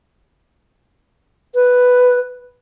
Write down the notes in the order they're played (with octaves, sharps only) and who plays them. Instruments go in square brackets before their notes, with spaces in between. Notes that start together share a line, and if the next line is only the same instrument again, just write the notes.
[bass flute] B4